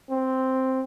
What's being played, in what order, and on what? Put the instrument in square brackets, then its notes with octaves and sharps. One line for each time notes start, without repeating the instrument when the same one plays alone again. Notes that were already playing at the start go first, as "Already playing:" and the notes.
[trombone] C4